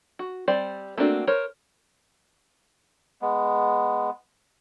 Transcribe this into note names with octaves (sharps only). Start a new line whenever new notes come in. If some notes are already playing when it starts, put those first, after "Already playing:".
F#4
G3 C4 C5 D5
A3 A#3 C4 D4 F#4
A#4 C5 C#5
G#3 B3